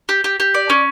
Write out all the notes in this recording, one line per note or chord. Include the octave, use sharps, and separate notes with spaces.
G4
G4
G4
D5
C#4